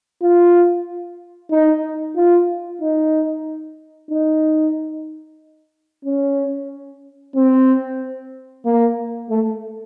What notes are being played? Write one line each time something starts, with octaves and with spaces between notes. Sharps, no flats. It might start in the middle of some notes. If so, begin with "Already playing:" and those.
F4
D#4
F4
D#4
D#4
C#4
C4
A#3
A3